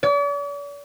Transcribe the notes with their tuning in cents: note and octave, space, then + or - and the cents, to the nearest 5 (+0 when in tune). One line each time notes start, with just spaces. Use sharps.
D5 -45